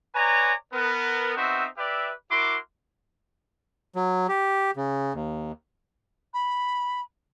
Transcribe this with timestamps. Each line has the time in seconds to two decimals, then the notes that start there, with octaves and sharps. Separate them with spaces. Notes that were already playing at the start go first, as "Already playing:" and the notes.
0.15 B4 C#5 D5 G#5 A#5
0.73 B3 A#4
1.36 B3 C4 D#4 F#4 C5 E5
1.77 G4 B4 D5 E5
2.31 E4 F#4 A#4 C6 D6
3.95 F#3
4.29 G4
4.76 C#3
5.14 D#2
6.33 B5